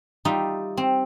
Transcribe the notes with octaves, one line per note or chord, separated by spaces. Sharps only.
G3 D#4 F4 E5
C4